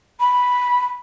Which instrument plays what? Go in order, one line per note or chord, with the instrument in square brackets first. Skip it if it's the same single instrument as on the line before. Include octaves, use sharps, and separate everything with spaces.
[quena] B5